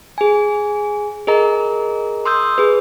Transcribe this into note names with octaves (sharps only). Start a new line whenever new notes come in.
G#4 G#5
G#4 A#4 D#5 A#5
C6 D#6 E6 G6
G#4 B4